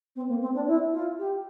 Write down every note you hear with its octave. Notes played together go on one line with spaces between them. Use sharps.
C4
A#3
C4
D4
E4
F4
G4